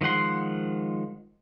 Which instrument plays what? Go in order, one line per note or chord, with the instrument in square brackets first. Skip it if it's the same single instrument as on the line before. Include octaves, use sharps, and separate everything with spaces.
[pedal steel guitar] D#3 F3 G#3 F#5 C6